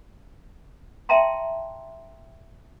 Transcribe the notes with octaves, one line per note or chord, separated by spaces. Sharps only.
E5 G5 A5 A#5 C6